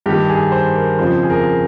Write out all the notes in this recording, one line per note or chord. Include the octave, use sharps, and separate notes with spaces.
G2 D#3 G4
G#4
C5
A#4
F2 C#3 F3 C5
G#4
A#4